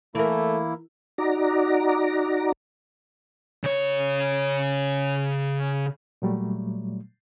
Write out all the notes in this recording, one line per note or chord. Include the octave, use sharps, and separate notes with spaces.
E3 A3 A#3 E4 A#4
D#4 F#4 D5 A#5
C#3 C#5
A#2 F#3 G3 A3